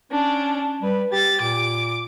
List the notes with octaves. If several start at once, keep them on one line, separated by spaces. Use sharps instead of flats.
C#4 D4
G3 B4
G4 A6
A#2 D6